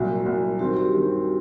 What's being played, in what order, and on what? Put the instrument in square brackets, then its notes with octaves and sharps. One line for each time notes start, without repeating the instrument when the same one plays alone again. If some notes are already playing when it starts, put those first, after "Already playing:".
Already playing: [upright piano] C2 A#2 F#3 [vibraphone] F#4
[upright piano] C2 A#2 F#3
[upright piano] G2 D#3 G3 C4 [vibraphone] F#4
[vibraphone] G4
[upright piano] G2 D#3 G3 C4